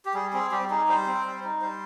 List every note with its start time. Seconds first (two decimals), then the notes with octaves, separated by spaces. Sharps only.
0.05 G4
0.14 G3 G#4
0.33 C4 G#4
0.52 G3 G4
0.70 D#4 G#4
0.88 G3 C5
1.06 C4
1.26 G3
1.44 D#4
1.61 G3 C5